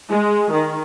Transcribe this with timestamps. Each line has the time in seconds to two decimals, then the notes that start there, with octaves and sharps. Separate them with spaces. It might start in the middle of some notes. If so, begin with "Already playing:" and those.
0.10 G#3
0.52 D#3